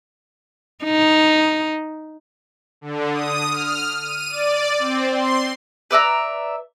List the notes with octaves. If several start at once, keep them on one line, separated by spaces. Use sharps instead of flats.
D#4
D3
D#6
F6
D#7
D5
C4
C6
B4 D5 E5 A#5